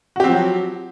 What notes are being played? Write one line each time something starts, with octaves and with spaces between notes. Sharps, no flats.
F3 F#3 C4 F#4 G4